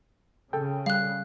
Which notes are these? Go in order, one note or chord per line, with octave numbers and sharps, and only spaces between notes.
C#3 A4 G5
G3 F5 F#6